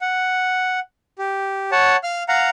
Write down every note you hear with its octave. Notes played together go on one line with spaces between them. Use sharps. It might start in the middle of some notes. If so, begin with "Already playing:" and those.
F#5
G4
C#5 F#5 A5
F5 F6
F5 F#5 A#5